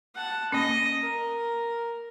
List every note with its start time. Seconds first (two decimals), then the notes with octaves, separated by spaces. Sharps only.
0.15 F#5 A5
0.52 A#3 C#4 D#5
1.01 A#4